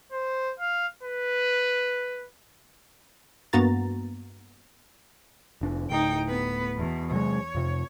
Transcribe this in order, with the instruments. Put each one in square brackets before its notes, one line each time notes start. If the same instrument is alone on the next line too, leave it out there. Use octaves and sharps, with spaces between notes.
[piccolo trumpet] C5
F5
B4
[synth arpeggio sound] G2 A#3 B3 F#4 A#5 A6
[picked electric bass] F1 D4
[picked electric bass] D1 D2 [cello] D#4 G5
[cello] B3 B4
E2 B2
[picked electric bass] C3 F#3 G#3 [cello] C#5
[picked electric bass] F2 C3